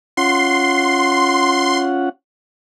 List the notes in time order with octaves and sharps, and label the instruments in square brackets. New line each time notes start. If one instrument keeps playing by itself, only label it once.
[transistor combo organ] C#4 F4 F#5 [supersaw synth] C6